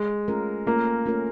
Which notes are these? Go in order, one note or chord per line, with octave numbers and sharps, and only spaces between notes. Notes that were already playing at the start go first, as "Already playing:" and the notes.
Already playing: G#3
A3 C#4 F4 A#4
A3 A#3 C#4 F4 A#4
A3 C#4 F4 A#4